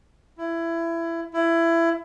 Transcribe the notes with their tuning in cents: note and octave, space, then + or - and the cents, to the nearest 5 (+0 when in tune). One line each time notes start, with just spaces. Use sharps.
E4 +20
E4 +20